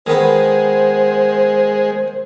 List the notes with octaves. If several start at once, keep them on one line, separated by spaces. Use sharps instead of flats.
D#3 G#3 B3 C5